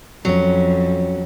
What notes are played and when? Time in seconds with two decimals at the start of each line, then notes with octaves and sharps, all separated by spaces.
0.25 F2 F#3 C#4